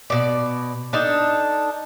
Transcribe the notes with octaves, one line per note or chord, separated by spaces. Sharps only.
B2 D5
D4 D#4 A4